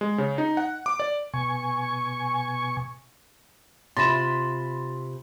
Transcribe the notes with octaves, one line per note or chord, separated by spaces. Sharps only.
G#3
C#3
D#4
F#5
D6
D5
B2 G#5 C#6
C3 F4 B5 C6 A6 A#6 E7